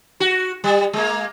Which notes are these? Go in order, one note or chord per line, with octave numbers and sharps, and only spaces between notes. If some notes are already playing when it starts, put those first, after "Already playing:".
F#4
G3
G#3 A#3